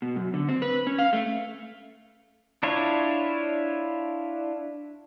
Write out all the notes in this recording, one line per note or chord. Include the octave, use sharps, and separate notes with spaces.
B2
F#2
D3
C4
B4
C#4
F5
A3
D4 E4 F4 C#5